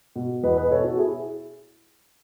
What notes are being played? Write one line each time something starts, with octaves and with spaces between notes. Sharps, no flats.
B2
E2 B4 D#5
B4 D#5
B2 A4 C#5
F#4 A4
E4 G#4